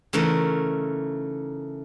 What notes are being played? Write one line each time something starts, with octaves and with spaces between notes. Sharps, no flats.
C#3 E3 A3 D#4 A#4